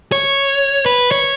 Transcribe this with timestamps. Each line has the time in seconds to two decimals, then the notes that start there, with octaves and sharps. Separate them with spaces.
0.12 C#5
0.86 B4
1.12 C#5